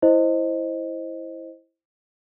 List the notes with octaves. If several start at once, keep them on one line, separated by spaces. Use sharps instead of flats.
E4 C5 D#5